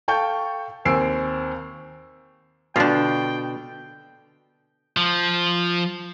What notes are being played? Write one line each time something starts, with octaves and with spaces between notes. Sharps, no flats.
A4 F5 G5 A5 C#6 G6
D#2 C4 G#5 E6 C7 D7
B2 D3 D4 F4 G5
F3